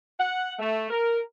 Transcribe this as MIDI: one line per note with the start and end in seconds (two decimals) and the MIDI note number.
0.19 0.53 78
0.58 0.88 57
0.90 1.20 70